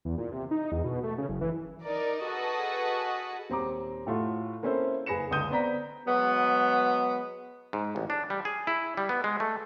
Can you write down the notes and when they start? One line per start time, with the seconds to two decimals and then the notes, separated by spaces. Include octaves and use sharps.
0.05 E2
0.18 A#2
0.32 C3
0.51 D#4
0.72 E2
0.84 B2
1.03 A3
1.18 C#3
1.29 F#1
1.41 E3
1.83 D#4 A#4 D5
2.25 F#4 G#4 A4 B4 D#5 F#5
3.50 D#1 C4 A#5 D6
4.07 A2 A3 F4 F#4
4.63 A#3 C4 C#4 E4 A4 C5
5.06 F#1 G#4 B4 A#6 C#7 E7
5.31 C#2 D3 D#6 G6 D#7
5.50 B3 C4 D5 A#5 B6
6.07 F#3 G#3 B3
7.73 G#2
7.96 A1
8.10 D4
8.30 G3
8.45 G#4
8.67 E4
8.97 G3
9.09 B3
9.24 G#3
9.40 A3